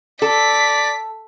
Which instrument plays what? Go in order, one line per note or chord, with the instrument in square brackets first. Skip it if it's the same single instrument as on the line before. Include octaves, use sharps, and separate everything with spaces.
[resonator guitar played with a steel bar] A4 [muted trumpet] D5 [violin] B6